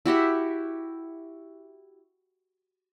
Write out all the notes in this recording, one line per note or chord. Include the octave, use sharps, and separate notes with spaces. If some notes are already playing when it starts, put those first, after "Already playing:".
E4 F#4 G4 E5